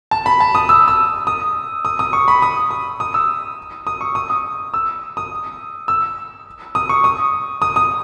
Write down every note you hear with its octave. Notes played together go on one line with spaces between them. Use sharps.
A5
B5
A5
D#6
E6
E6
D#6
D#6
D#6
C#6
B5
D#6
D#6
D#6
E6
D#6
C#6
D#6
D#6
E6
D#6
E6
D#6
C#6
D#6
D#6
D#6